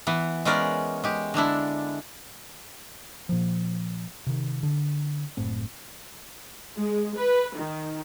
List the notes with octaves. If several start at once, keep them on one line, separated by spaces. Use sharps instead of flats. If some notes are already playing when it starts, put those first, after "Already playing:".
E3 B3
G#3 B3 C#4 A#4 D5
G#3 G4
D3 G#3 D4 E4
A#2 F3
C3 D#3
D3
F#1 A2 C4
G#3
B4
D#3